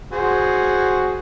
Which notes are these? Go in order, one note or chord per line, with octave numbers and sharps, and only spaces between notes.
F#4 G#4 C5